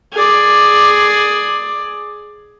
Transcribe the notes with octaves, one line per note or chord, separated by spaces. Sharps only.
G#4 D5